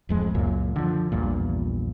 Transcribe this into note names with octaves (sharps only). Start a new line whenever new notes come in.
D1 F2 G#3
C#2 F#2 A#2
D3 F3
A#1 E2 G2 A#2